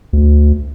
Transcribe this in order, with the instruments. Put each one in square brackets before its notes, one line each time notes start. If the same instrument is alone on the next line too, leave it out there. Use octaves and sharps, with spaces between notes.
[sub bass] D2